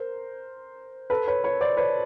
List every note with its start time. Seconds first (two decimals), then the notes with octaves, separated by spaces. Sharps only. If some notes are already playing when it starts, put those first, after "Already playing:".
Already playing: A#4 C5
1.10 A4 B4
1.27 B4 C#5
1.44 B4 C#5
1.61 C5 D5
1.77 B4 C#5